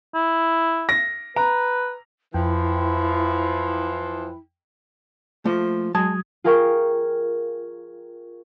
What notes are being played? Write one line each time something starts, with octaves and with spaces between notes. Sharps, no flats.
E4
A#6
B4 A#5
F2 E3 F3 E4 G5
F3 A3 A#3
F#3 G#3 A5 D#6 G#6
F4 G#4 A#4 F5 G5 C#6